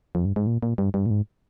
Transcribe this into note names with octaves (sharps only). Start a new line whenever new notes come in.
F2
G2
G#2
A#2
A#2
G2
G2
A#2
G#2